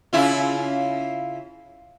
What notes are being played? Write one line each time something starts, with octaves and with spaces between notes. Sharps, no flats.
C#3 E4 F4